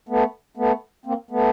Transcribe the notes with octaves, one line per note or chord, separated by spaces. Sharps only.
A3 B3
A3 B3
A#3 C4
A3 B3